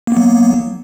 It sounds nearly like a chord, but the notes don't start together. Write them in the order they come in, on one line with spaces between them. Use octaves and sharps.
A#3 B3 F#3